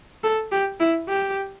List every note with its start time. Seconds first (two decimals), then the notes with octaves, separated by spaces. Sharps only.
0.24 A4
0.52 G4
0.80 E4
1.09 G4